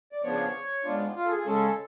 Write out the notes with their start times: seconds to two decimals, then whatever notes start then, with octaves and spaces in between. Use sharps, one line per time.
0.12 D5
0.23 C#3 F3 B3 D4 C#5
0.84 G#2 G#3 B3 D4 F4
1.15 F4
1.25 A4
1.30 G#4
1.45 C#3 G#3 C#4 A4